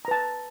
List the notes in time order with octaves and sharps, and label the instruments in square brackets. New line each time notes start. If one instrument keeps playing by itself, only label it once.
[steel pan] A#5
B4
A5